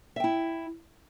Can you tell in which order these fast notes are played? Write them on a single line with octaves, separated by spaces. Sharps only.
E5 G5 E4